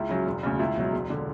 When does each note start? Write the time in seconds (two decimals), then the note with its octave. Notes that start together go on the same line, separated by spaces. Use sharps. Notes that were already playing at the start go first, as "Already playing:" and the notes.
Already playing: C#2 E4
0.09 C#3 F#3
0.26 E1
0.43 D2 C#3
0.59 C#2 E4
0.76 B2 F#3
0.93 E1
1.10 D3